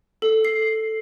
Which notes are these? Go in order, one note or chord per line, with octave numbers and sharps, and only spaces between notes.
A4
C7